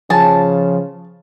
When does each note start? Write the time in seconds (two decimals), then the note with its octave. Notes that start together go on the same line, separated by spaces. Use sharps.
0.10 C#3 F3 G#4 A5